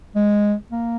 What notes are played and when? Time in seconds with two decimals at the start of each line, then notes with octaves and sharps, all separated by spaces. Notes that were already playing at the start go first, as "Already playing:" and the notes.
0.15 G#3
0.72 A#3